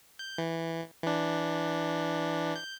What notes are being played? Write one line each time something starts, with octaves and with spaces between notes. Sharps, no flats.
G6
E3
E3 D4
G6